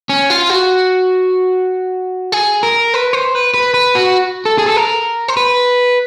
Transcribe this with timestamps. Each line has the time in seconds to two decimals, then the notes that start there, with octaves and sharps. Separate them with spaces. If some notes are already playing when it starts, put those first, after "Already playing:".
0.09 C#4
0.30 F4
0.50 F#4
2.32 G#4
2.63 A#4
2.94 B4
3.13 C5
3.35 B4
3.54 B4
3.74 B4
3.95 F#4
4.45 A4
4.58 G#4
4.66 A4
4.76 A#4
5.28 C5
5.37 B4